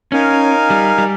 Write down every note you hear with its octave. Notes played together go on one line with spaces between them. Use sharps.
C#4 D#4 A#4 F5 G#5
G3
G3